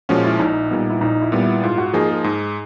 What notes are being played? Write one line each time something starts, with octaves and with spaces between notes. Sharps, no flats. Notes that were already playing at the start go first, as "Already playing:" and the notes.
A#2 F3 G#3 C#4 F#4
E4
A#1 D#4
A#2 G3 B3
E4
A#1 D#4
E4
A#2 G3 B3
E4
G#2 F4
F#4
F3 A#3 D#4 G#4
G#4
G#2